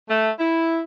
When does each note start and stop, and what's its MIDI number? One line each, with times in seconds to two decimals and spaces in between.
0.09 0.30 57
0.39 0.80 64